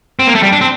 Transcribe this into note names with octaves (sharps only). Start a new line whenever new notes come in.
C4
A#3
A3
G3
D4
C4